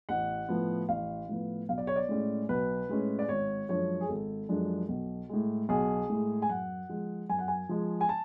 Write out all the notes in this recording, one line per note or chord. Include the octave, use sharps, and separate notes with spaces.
A1 F#5
A2 F3 B3
A1 F5
A2 F3 B3
B1 F5
D5
C#5
D5
A2 G#3 C#4
B1 B4
A2 G#3 C#4
D5
G#1 C#5
F#2 F3 G#3 D4 C#5
G#4
G#1 A4
F#2 F3 G#3 D4
B1
A2 G#3
B1 G#4
A2 G#3
G#5
F#2 F#5
F3 G#3
F#2 G#5
F#5
G#5
F3 G#3
G#5
A5